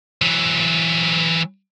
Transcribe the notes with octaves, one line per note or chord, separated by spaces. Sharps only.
E3 F#3